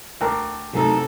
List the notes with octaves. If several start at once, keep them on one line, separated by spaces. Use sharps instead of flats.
D2 A#4 G5 A5 D6
F#2 C3 A3 D#4 A4